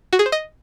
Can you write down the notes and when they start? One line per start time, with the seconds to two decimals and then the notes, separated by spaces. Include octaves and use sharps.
0.13 F#4
0.19 G#4
0.26 C5
0.32 D#5